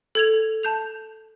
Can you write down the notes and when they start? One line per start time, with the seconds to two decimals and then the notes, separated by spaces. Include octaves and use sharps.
0.15 A4 G#6 F7
0.63 A5 G6 F7